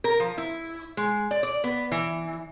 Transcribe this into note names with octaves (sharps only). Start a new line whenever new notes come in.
A#4
F3
E4
G#3
D5
D5
B3
E3